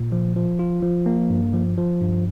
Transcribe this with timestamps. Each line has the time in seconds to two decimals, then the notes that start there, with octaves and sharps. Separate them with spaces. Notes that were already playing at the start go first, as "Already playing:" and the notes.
Already playing: A#2
0.12 F3
0.36 F3
0.59 F4
0.83 F3
1.06 A#3
1.30 G2
1.54 F3
1.78 F3
2.01 G2